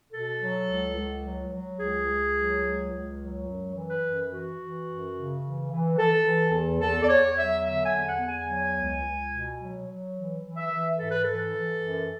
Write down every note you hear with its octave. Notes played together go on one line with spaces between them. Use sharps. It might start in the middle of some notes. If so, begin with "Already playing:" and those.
B2 A4
F#3
C#2
C#2
F#3
F#3
C#2 G#4
C#2
F#3
C#2
C#2
F#3
F#2
E3
B4
F#2
E3 F#4
E3
F#2
C#3
E3
E3
E3 A4
E3
E2
E2 A4
D5
E2 C#5
F#3 E5
D3 E5
G#5
E2
F#5
E2
G#5
F#3
C#2
C#2
B2
F#3
F#3
E3
E3
E5
E3
G#2 A4
B4
E3 A4
E3
F#2